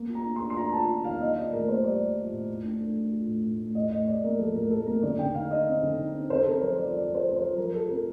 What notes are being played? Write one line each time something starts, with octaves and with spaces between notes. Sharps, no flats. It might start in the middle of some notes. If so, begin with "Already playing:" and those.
Already playing: A#3
F4
A#5
D4
C6
D4
C6
F4 A#5
F4 A5
F4
D#3 F5
A#3 D#5
F4 D5
A2 A#4
A#3 C5
G3 D5
G3
F4
A2
A2
D4
A3
A3
F4
A2
A2
A2
A2 D#5
A2 D#5
A2 D5
A#3 A#4
F3 A4
A2 A#4
A2 A4
A#3 A#4
D3 D5
D3 G5
D#4 F5
D#4 D#5
C4
D3
D#4
C4
C4 C5
C4 A4
A#4
F3 C5
F4 D5
F3 D5
F3
C5
F3
C5
F4
F3 A#4
A#4
F4 A4
A4
C4 A#4